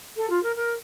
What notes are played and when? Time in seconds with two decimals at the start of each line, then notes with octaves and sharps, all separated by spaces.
0.16 A4
0.29 F4
0.42 A#4
0.55 A#4